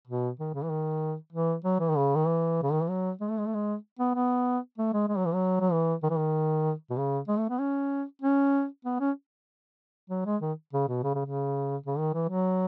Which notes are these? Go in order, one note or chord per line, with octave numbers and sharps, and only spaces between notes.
B2
D#3
C#3
E3
D#3
E3
F#3
E3
D#3
C#3
D#3
E3
C#3
D#3
E3
F#3
G#3
A3
G#3
A3
G#3
B3
B3
A3
G#3
G#3
F#3
E3
F#3
F#3
E3
D#3
E3
D#3
B2
C#3
G#3
A3
B3
C#4
C#4
B3
C#4
F#3
G#3
D#3
C#3
B2
C#3
C#3
C#3
C#3
D#3
E3
F#3